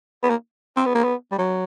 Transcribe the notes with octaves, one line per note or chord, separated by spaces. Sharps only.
B3
A#3
C4
B3
A#3
B3
G3
F#3